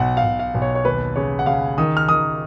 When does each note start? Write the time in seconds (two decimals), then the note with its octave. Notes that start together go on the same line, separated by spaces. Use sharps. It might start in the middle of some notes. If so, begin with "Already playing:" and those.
Already playing: B1 F#5
0.17 F5
0.24 B1
0.39 F5
0.54 B1
0.62 C#5
0.75 C#5
0.85 D#2 B4
1.16 C#3 C#5
1.39 F#5
1.46 C#3 F5
1.78 D#3 D#6
1.97 F6
2.09 D#3 D#6